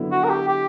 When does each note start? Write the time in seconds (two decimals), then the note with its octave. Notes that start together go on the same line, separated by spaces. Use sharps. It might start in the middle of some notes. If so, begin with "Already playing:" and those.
Already playing: D3 F#3 B3 E4
0.12 F#4
0.24 A#4
0.29 G4
0.48 G4